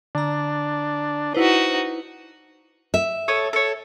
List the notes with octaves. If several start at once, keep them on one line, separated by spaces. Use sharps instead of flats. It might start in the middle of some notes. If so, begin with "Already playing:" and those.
D3 D4 A#5
D#4 E4 F#4 B4 C5
E5
A4 C#5 D#6
A4 C#5